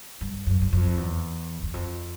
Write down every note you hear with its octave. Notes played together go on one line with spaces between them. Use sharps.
G2
F#2
F#2
F2
E2
E2
F2